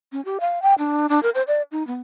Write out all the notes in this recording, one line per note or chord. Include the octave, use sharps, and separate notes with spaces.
C#4
G4
F5
G5
D4
D4
A#4
C5
D5
D#4
B3